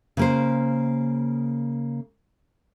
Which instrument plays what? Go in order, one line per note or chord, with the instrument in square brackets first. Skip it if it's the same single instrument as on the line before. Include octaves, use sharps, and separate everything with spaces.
[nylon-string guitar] C#3 A#3 C5